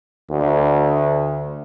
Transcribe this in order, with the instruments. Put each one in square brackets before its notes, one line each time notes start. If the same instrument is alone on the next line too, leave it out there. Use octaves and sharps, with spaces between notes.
[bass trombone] D2